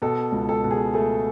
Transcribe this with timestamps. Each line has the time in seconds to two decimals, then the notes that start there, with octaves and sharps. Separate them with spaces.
0.02 B2 A4
0.32 C#2
0.49 A4
0.64 B2
0.71 G#4
0.94 A3 G#4